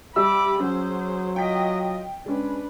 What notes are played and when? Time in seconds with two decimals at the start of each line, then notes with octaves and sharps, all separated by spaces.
0.16 G3 E5 B5 D6 E6
0.60 F#3 C#4 F#4 G#4 C5
1.36 F4 D#5 G5 B6
2.26 G#3 C#4 D4 B4